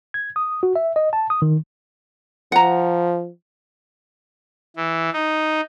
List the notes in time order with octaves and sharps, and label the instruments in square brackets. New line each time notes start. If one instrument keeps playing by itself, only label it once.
[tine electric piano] G#6
D#6
F#4
E5
D#5
A5
D#6
D#3
[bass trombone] F3 [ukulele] F#5 A#5
[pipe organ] E3
D#4